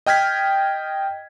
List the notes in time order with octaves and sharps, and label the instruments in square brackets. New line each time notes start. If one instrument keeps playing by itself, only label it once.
[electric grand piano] D#5 G5 F6 G#6 B6